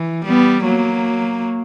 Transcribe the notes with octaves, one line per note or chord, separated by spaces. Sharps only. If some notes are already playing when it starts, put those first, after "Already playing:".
Already playing: E3
G3 B3
F#3 A#3